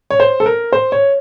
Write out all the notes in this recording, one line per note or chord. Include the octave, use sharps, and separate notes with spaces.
C#5
C5
A4
A#4
C5
C#5